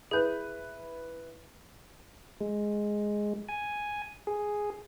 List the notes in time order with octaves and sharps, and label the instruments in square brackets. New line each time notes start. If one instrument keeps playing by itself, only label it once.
[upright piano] E4 B4 [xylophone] G#4 G6
[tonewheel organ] G#3
G#5
G#4